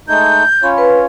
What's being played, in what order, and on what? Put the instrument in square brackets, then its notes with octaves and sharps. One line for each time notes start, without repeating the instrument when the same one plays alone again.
[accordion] G#3 A3 D#4 [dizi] G6
[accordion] C#4 F4 C#5 [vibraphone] B5
[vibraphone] B4